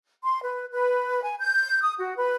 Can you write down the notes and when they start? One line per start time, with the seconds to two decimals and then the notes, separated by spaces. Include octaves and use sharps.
0.23 C6
0.43 B4
0.71 B4
1.23 G#5
1.39 G6
1.83 D#6
1.98 F#4
2.15 B4